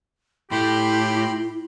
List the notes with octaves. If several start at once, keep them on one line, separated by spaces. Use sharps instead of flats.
A2 A3 E4 G4 G5 B5 C6